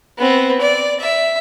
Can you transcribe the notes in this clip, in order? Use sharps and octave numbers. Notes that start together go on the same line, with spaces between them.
B3 C4
D5
E5